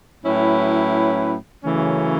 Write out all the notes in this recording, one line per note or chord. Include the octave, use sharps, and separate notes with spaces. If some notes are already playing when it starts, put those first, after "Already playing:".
A2 F#3 C#4 E4 B4
F#2 C#3 E3 A3 C#4